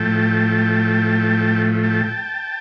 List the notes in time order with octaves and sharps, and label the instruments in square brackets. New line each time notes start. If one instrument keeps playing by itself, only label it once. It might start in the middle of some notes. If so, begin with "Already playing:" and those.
Already playing: [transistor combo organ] A2 F3 A3 G5 A5
G5 A5